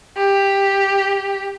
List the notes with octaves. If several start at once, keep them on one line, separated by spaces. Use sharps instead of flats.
G4